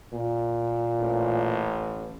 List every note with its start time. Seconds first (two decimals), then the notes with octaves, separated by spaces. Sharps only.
0.13 A#2
0.99 A1